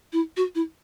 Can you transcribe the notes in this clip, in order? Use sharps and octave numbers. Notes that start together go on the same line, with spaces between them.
E4
F#4
E4